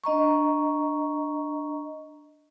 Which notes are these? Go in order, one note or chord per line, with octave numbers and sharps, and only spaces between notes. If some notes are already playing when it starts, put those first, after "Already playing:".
D4 D#5 A#5 C#6